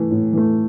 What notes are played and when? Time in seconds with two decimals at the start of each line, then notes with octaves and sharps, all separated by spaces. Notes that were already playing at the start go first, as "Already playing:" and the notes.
Already playing: E3 A3
0.11 A2
0.33 E3 A3